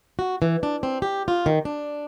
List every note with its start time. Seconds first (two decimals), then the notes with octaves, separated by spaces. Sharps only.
0.19 F#4
0.42 E3
0.63 D4
0.83 C4
1.02 G4
1.28 F4
1.46 D#3
1.65 D4